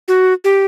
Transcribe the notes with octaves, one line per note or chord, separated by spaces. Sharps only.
F#4
G4